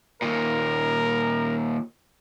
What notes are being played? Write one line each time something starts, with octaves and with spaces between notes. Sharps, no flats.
D#2 A#2 A#4